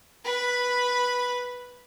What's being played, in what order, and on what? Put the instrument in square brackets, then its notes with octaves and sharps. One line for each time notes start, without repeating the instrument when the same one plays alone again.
[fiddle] B4 B5